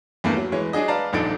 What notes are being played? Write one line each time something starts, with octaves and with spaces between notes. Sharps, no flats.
E2 G2 A3 A#3
F#3
E3 G#3 C#5
F#3 D4 G#4 D#5
B4 D5 F5 A5 A#5
D#1 A#1 D4 D#4 A4 D7